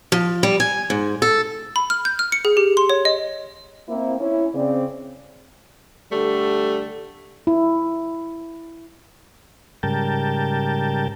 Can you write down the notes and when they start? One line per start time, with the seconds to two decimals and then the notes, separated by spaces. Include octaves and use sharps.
0.12 F3
0.43 G3
0.60 G#5
0.90 G#2
1.22 A4
1.76 B5
1.90 F6
2.05 G6
2.19 F6
2.32 C#7
2.45 G#4
2.57 G4
2.77 C6
2.90 C#5
3.05 D#5
3.89 A#3 C4 E4
4.20 C#4 E4
4.54 C#3 C4 D5
6.12 D3 G3 A3
7.47 E4
9.83 G#2 C#3 G3 A#4 G5 A5